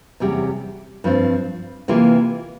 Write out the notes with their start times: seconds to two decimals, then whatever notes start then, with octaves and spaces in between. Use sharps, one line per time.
0.20 E2 C3 G3 C#4 G4
1.04 G2 F3 C4
1.88 C3 E3 A#3 F4